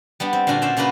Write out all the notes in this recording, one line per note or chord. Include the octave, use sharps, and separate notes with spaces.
G3 B3 D4
C4
A#2 D3 D4 F#4 G#5
C#4 C5 D5 E5
C#3 A#3 D4 F#4 B4